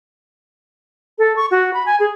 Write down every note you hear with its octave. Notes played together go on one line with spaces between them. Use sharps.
A4
C#6
F#4
B5
G#5
G#4